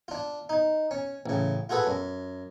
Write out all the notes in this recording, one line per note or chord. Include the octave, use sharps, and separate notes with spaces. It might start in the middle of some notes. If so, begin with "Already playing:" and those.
D4 F4
D#4
C#4
A1 C#3
F4 F#4 G#4 A4 B4
F#2